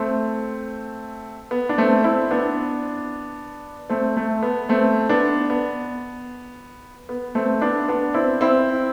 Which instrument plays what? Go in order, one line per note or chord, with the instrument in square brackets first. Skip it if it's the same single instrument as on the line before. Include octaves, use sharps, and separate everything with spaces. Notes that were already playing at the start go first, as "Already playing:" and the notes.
Already playing: [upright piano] A3 C4
B3
D4
A3 C4
C4 E4
B3 D4
A3 C4
A3
B3
A3 C4
B3 D4
B3
B3
A3 C4
B3 D4
B3 D4
C4 E4
C4 E4